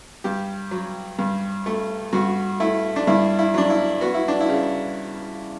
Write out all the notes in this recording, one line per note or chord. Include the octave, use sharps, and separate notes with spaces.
G2 G4
F#3
G2
A3
G2 F#4
A3 E4
D4
G2 E4
E4
F#3 D4
E4
B3 F#4
E4
D4
E4
C#3